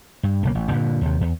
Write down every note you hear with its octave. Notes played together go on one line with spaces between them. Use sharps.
G2
B1 C#3 A#3
A1
G2 A#2 D3
D#2 C3
E2